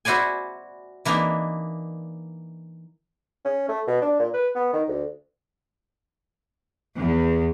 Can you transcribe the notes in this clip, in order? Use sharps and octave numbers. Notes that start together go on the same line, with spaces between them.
E4 F#4 C5 D5 G#5
E3 A#3 D4 D#4
C#4
A3
B2
D4
A#2
B4
B3
D#3
D2
E2